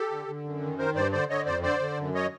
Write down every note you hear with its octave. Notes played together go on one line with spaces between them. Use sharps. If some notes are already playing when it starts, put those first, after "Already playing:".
Already playing: G4 A4
D3
D3
F#2
D#3
D#3 A#4 C5
G2 C5 D5
D3 C5 D5
D3 C#5 D#5
F2 C5 D5
D3 C5 D5
D3
F#2
C#5 D#5